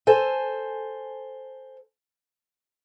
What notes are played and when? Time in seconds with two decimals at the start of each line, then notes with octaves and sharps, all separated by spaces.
0.07 A4 C5 G#5